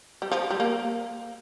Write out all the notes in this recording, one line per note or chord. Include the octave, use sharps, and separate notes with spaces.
G3
F3
G3
A#3